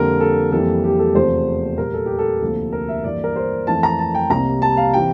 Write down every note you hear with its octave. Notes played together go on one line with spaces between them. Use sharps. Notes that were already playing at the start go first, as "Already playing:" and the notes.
Already playing: F2 D3 G3 A#3 A#4
A4
F2 E3 G3 A#3 A4
G4
A4
E2 C3 F3 A3 C5
A#2 G3 A#3 A#4
A4
G4
A4
D2 C3 F3 A#3
A#4
E5
G2 E3 A#3 D5
A#4
C5
F2 E3 A3 A5
A#5
A5
G5
C2 C3 G3 A#3 A#5
A5
F5
C3 E3 G5